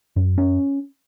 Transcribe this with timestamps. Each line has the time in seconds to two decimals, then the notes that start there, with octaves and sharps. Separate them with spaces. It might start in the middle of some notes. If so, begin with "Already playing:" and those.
0.16 F#2
0.38 C#4